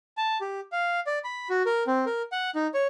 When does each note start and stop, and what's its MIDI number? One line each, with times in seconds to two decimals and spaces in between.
0.17 0.38 81
0.41 0.60 67
0.72 1.00 77
1.07 1.19 74
1.24 1.48 83
1.50 1.63 66
1.66 1.83 70
1.87 2.05 60
2.06 2.22 70
2.32 2.51 78
2.55 2.67 63
2.74 2.87 73